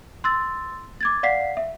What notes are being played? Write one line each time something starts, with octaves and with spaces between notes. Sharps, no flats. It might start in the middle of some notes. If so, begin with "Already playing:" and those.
C6 E6 A6
D6 G#6 A6
D5 F5 F#5 B6 C7
E5